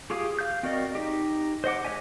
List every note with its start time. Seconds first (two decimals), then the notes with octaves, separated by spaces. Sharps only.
0.10 F4 G4 G#4 F5 D#6
0.39 F5 G6
0.63 C4 F#4 A#4 D5 D#5
0.95 D#4 G4
1.64 C5 D#5 F#5 D6
1.84 G#3 C#5 D#5 E5 G#5